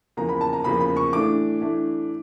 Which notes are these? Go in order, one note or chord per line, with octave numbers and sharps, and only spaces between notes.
E2 C#3 F3 A#3 A#5
B5
A5
A#5
E2 C#3 F3 A#3 B5
B5
C#6
A2 E3 A3 D4 D6
A2 E3 A3 D4